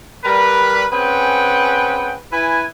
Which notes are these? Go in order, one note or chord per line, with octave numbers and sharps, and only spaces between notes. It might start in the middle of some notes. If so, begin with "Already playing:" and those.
G3 A#4 B4
C4 C#4 G#4 B4 F#5 G5
E4 B4 G#5